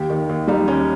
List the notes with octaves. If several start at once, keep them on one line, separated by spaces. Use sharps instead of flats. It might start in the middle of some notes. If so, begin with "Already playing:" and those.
Already playing: D#2 G4
D#3
D#2
G3 D#4
D#2 C#4